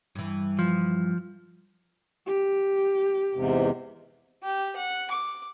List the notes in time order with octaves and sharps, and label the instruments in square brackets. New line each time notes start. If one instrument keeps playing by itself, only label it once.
[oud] G2 E3
[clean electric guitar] F3
[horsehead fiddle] G4
[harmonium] E2 G#2 C3
[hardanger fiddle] G4
F#5
D6